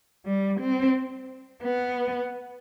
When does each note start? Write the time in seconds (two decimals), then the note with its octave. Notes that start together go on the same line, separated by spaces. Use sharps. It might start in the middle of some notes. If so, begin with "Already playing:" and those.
0.25 G3
0.59 C4
1.63 B3